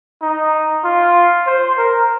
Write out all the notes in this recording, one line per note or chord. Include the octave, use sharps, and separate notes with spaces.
D#4
F4
C5
A#4